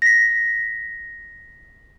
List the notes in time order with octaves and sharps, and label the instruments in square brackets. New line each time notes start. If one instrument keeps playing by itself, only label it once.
[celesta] A#6 B6